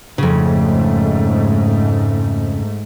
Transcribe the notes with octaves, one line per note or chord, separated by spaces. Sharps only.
F2 G#2 C#3 A3